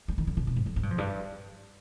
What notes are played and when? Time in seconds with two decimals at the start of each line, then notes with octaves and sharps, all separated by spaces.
0.08 G3
0.18 D#3
0.27 D3
0.37 C3
0.47 B2
0.56 G#2
0.66 F2
0.76 G#2
0.83 G2
0.91 F2
0.98 G2